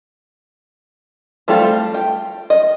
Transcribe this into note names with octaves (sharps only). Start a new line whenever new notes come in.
G3 A3 C4 F4 A4
G5
D#5